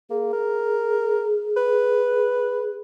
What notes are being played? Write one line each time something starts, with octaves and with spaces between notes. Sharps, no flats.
A#3 G#4
A#4
B4